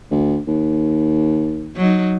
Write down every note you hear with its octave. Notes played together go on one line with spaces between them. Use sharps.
D2
D#2
F#3 D#4